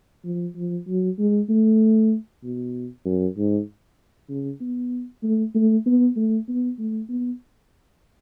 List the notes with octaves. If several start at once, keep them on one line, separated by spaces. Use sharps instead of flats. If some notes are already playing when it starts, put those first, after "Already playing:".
F3
F3
F#3
G#3
A3
B2
F#2
G#2
C#3
B3
A3
A3
B3
A3
B3
A3
B3